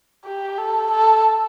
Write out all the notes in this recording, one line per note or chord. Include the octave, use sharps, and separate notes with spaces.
G4
A4
A4